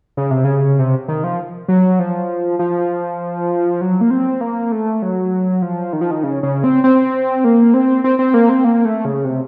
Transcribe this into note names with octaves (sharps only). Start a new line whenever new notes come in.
C#3
C3
C#3
C3
D#3
F3
F#3
F3
F3
F#3
A#3
C4
A#3
A3
F#3
F3
D#3
F3
D#3
C#3
C#3
C4
C4
A#3
C4
C4
C4
A#3
C4
A#3
A3
C#3
C3